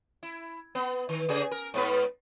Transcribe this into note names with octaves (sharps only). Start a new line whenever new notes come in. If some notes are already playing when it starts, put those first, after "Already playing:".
E4
B3
D#3
C#3 G#4
A#4
G#2 B3 B4